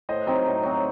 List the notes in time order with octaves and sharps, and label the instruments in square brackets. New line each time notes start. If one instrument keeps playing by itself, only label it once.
[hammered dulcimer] A2 [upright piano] C5 D#5
[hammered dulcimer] F#3 C4 D#4 [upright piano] C5 D#5
[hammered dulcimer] A2
F#3 C4 D#4